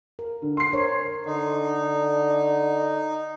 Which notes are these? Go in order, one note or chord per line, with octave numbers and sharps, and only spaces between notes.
A#4
D3
C6 C7
A#4 C5 C#5
D3 D#4